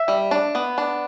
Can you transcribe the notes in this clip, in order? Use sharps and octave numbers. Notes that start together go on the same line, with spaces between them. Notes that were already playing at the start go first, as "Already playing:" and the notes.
Already playing: E5
G3
D4
B3
D4